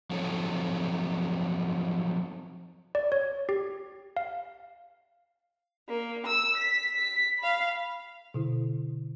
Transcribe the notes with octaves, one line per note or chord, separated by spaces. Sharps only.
F3 F#3 C4 D#4 A4 C#5
D5
C#5
G4
F5
A#3
E6
B6
B6
F5 B5
B2 D3 E4